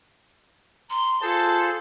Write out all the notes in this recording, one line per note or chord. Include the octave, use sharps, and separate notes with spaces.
A#5 C6
F4 G#4 A4 C5 A5